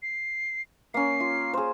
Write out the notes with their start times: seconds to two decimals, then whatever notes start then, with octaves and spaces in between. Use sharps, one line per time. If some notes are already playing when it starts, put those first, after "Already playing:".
0.02 C7
0.94 A#3 C#4 C7
1.20 F4
1.53 G#4 C5